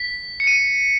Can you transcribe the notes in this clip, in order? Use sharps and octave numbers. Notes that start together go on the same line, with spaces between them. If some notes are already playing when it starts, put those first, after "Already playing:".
Already playing: B6
C#7
D#7